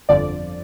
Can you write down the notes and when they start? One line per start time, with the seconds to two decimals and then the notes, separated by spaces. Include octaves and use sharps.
0.09 G1 F2 D3 F3 D5